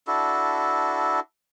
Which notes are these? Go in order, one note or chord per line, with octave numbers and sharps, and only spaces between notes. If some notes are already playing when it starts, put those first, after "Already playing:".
D4 E4 F#4 A4